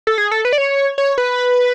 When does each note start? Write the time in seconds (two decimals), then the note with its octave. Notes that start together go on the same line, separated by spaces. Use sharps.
0.07 A4
0.18 G#4
0.31 A4
0.45 B4
0.53 D5
0.58 C#5
0.98 C#5
1.18 B4